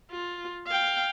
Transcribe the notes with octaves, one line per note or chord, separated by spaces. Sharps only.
F4
F5 G5